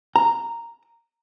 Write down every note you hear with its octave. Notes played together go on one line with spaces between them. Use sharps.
A#5